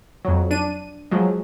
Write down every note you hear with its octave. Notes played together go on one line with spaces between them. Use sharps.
F2 F#3
D4 D#7
F3 F#3 G#3